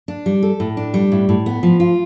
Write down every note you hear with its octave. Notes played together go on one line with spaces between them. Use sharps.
D4
G3
A4
A2
D4
G3
A2
A2
B3
F3
F4